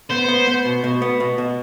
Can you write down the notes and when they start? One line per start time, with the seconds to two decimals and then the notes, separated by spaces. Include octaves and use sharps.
0.10 B3 C5
0.28 B3
0.47 B3
0.65 B2
0.84 B2
1.02 B3
1.20 B2
1.38 B2